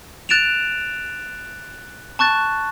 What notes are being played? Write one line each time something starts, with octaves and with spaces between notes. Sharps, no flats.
F#6 A6 D7 E7 F7
A5 C#6 F#6 A6